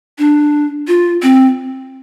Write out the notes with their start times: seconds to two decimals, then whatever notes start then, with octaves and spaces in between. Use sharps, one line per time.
0.19 D4
0.88 F4
1.23 C4